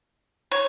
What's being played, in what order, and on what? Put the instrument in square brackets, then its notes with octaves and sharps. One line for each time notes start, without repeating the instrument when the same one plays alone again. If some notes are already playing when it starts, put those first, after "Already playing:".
[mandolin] C#5